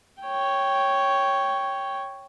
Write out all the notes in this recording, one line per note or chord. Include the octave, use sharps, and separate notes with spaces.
C#5 G5